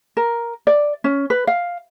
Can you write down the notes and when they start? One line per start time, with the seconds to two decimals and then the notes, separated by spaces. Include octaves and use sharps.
0.17 A#4
0.67 D5
1.04 C#4
1.30 B4
1.47 F5